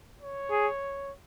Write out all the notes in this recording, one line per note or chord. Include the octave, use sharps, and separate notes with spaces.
C#5
G#4